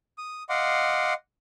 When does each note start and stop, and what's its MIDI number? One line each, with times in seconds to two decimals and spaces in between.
0.18 0.43 87
0.49 1.13 75
0.49 1.13 77
0.49 1.13 78
0.49 1.13 84
0.49 1.13 86